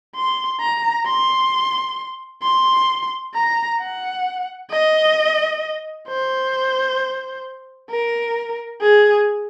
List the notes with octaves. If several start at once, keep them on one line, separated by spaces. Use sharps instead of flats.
C6
A#5
C6
C6
A#5
F#5
D#5
C5
A#4
G#4